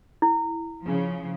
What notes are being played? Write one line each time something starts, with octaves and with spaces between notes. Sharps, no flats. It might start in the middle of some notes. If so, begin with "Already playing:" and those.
E4
C#3 F3